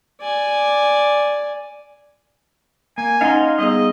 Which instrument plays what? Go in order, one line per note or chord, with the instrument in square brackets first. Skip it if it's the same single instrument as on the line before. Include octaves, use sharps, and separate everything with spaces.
[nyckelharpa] D5 G#5
[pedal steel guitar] A#3 [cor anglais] G#5
[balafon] C#4 F#5 [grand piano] D#4 [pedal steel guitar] F5 A#5 C6
[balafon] G3 B3 G#4 [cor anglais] D#5